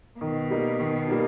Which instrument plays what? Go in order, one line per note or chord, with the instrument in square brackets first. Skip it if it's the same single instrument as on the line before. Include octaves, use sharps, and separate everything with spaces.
[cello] B2 [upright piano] D#3
[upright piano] G3 A#3 D#4
D#3
G3 A#3 D#4